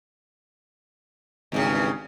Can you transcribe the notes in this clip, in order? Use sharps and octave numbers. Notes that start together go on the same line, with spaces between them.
G#1 E2 G2 C#3